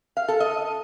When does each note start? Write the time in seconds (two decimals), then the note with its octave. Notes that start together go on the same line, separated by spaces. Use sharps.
0.17 F5
0.29 A4
0.40 D#5